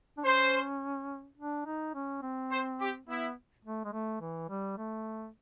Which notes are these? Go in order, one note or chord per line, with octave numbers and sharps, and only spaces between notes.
D4
C#4 C5
D4
D#4
C#4
C4
C5
G4
B3 E4
A3
G#3
A3
E3
G3
A3